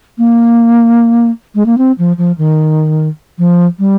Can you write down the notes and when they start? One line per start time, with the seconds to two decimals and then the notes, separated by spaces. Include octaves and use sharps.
0.18 A#3
1.55 G#3
1.66 A#3
1.78 C4
1.98 F3
2.18 F3
2.38 D#3
3.38 F3
3.79 G3